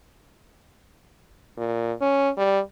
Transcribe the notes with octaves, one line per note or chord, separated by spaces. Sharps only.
A#2
C#4
G3